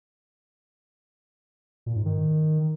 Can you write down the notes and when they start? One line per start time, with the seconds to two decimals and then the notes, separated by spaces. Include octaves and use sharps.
1.86 A#2
1.96 G#2
2.06 D#3